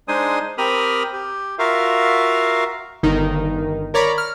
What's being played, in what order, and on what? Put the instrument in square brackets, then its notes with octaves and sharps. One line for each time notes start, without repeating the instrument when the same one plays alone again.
[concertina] G#3 D4 D#4 C5 G#5 D#6
C4 G4 A#4 B5 D#6 F6
G4
F4 F#4 A#4 E5 F5
[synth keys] G1 D#3 D#4
A#4 C#5 D5 A#5 B5
F6